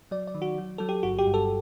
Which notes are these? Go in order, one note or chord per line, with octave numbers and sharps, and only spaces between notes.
F#3 D5
D5
D#3
F#4
F#3
F#3 A4
G4
G1 F#4
G4
G2
A4